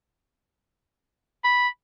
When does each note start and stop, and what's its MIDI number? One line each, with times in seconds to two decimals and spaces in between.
1.44 1.68 83